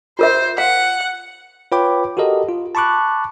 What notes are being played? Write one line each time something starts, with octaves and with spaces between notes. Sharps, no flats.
F4 A#4 C5 E5
F5 F#5
F4 B4 C#5 G5 B5 D6
F#4 G4 A4 A#4 D#5
F4
A5 B5 C#6 D6 F#6